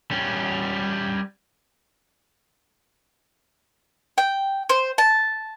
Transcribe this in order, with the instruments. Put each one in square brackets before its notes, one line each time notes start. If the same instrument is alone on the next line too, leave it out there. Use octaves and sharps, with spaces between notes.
[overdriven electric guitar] G3 C#4
[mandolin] G5
C5
A5